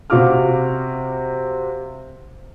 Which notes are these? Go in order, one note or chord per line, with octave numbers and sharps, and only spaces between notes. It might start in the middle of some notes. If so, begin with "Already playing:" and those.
C3 F#4 F5 D6 F6